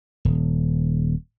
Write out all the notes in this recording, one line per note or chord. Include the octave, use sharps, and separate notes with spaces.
D#1